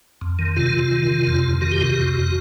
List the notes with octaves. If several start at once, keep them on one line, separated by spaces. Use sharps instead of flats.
F2
D#3
C3 F4
C3
D#3
C3
F2
F2
D#3 F#4
G4
C3 F#4
F2
F2